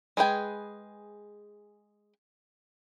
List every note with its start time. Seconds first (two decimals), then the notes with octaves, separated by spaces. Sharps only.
0.17 G#3 G#4 B4 G5 G#5